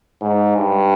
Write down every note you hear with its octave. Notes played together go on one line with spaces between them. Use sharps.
G#2
G2